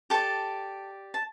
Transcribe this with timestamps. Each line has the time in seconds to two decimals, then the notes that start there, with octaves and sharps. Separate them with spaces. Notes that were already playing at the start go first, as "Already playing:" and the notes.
0.10 G4 A4 D5 A5
1.14 A5